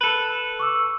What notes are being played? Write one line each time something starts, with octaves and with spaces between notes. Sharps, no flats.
A4 B4
C#6 D6 E6